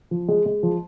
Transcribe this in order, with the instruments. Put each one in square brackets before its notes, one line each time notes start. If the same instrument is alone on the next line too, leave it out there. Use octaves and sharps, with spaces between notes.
[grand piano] F3
G#3
G#3
F3